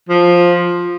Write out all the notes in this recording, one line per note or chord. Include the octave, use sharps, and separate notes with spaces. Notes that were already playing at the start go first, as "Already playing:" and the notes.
F3